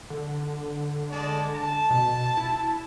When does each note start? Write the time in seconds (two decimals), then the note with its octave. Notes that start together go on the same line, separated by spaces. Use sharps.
0.10 D3
1.11 G#3 D5 A5
1.54 A5
1.90 B2
2.37 E4